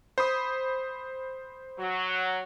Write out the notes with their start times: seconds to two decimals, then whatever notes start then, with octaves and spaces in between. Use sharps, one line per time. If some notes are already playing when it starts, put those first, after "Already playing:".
0.18 C5 B5 D#6
1.79 F#3